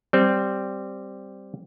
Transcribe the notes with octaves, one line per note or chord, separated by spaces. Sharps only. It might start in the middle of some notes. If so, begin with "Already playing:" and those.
G3 C4